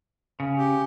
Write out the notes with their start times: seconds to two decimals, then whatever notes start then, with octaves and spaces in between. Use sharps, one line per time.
0.40 C#3
0.57 G4